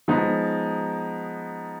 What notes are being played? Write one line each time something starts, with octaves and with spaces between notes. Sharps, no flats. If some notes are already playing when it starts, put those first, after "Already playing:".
F3 G#3 B3 D#4